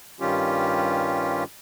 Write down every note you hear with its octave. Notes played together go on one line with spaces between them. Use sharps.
G2 D#3 G3 C#4 F4 G4